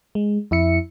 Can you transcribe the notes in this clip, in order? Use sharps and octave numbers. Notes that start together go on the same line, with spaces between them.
G#3
F2 E4 E5 C#7